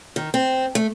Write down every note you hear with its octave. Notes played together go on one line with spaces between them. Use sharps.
D#3
C4
A3